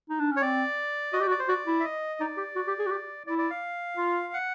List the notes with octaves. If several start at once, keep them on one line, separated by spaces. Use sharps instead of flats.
D#4
D4
C#4
C#5
C4 D5
F#4 D#5
G4 D5
F#4
D5
C5
F#4 D5
E4
E5
D#5
D#4 D5
G4
F#4
G4
G#4
F#4
G4
E4 D5
D5
F5
F4
F#5